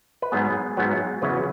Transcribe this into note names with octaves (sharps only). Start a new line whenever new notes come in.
B4
G#2 F#3 B3 G#4
G#2 F#3 B3
E2 C#3 F#3 B4